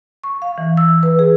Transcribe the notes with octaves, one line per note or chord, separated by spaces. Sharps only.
C#6
F5
E3
E6
B4
G#4